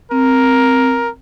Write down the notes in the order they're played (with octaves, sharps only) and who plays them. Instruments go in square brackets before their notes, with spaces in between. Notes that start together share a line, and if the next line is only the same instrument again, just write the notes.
[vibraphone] C4 [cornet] A#4